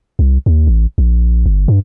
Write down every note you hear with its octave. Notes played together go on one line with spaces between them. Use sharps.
C2
D#2
A1
A#1
G1
G2